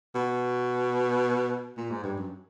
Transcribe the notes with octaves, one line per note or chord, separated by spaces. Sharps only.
B2
A#2
G#2
G2
F#2